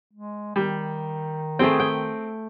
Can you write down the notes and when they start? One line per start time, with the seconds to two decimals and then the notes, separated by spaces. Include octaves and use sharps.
0.13 G#3
0.56 D#3 G3
1.59 A3 C4 G#4 G5
1.80 G5